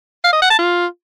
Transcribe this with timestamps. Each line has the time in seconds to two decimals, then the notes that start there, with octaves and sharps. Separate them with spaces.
0.24 F5
0.33 D#5
0.42 F#5
0.50 A5
0.59 F4